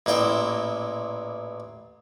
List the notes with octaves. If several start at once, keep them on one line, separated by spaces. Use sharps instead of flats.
A1 A#2 E4 G5